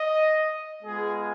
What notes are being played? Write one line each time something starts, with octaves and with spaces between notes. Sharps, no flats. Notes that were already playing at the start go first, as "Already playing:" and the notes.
Already playing: D#5
G#3 B3 F4 G#4